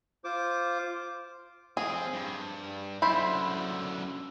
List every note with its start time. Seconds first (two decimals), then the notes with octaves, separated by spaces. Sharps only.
0.24 F4 C5 D6
1.77 F3 C4 G#4
2.13 G2
3.02 F#2 D3 E4 C5 B5